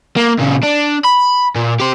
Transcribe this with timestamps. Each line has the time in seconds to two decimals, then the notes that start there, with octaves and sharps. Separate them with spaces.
0.16 A#3
0.39 A#2 C#3
0.63 D4
1.04 B5
1.55 A#2
1.80 G4 C5